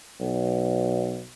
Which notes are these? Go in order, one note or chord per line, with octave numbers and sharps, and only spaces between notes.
B1